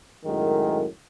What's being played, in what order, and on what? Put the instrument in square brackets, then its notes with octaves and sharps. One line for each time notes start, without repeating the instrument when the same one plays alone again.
[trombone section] F#2 A2 D#3 G#3